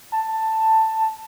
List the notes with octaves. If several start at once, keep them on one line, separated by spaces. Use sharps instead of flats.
A5